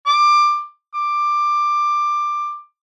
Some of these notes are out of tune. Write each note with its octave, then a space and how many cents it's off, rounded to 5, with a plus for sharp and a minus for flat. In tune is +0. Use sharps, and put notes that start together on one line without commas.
D6 +15
D6 +15